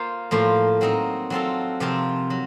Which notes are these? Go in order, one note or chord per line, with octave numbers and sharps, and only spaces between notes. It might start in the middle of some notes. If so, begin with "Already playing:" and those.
Already playing: A#3 F4 C5
A2 F3 A#3 F4 C5
F#3 C4 D#4 A#4
F#3 C4 F4 A4
C3 F3 C4 F4 A#4
F#3